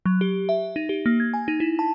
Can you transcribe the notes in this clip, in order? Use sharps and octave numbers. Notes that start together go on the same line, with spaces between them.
F#3
G4
E5
D#4
G4
A#3
G#6
G#5
D#4
E4
A5